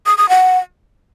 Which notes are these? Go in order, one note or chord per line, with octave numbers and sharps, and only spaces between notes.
D#6
D#6
F#5